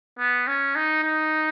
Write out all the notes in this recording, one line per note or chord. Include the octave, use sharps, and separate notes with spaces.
B3
C#4
D#4
D#4